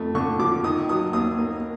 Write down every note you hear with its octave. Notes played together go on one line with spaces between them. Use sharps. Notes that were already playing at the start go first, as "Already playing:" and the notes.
Already playing: F2 A3
D3 C#6
F3 D6
D#3 D#6
F#3 D#6
D#2 D#6
A#3